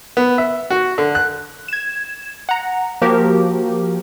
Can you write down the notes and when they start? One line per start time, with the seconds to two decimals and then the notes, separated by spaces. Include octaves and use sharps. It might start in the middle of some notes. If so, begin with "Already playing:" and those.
0.17 B3
0.38 E5
0.70 F#4
0.98 D3
1.15 F#6
1.68 G#6 E7
2.49 F#5 A#5
3.02 F3 A#3 F#4 G4 A#4